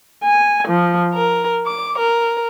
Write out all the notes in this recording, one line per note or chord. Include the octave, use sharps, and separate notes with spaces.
G#5
F3
A#4
D6
A#4